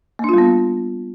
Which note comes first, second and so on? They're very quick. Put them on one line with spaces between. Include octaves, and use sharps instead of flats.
A#3 D4 F4 G3 B3